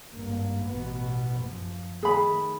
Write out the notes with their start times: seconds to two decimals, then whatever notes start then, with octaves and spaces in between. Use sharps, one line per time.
0.12 G#1 G2 A#3
0.67 A1 B2 B3
1.40 F#2 F3
2.03 D#3 A3 G#4 B5